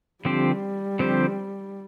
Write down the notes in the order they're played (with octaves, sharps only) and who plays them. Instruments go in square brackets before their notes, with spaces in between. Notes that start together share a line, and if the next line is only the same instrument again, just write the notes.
[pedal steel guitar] D3 F3 C4 G4 C5 [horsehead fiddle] G3
[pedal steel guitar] D3 F3 C4 G4 C5